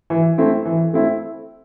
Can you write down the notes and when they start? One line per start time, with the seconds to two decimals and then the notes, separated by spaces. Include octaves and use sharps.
0.10 E3
0.38 A3 C4 E4
0.65 E3
0.93 A3 C4 E4